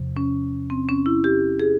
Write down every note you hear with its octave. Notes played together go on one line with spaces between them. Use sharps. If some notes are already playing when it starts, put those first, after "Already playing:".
Already playing: E2 C3 F3
C#4
C4
C#4
E4
G4
G#4